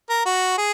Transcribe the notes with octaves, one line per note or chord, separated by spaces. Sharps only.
A#4
F#4
G#4